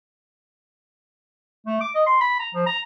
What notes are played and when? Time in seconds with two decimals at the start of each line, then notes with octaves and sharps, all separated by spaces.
1.66 A3
1.81 D6
1.95 D#5
2.07 C6
2.21 B5
2.40 A#5
2.55 F3
2.66 A#5